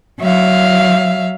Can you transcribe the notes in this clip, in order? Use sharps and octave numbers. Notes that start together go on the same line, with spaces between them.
F#3 E5 F5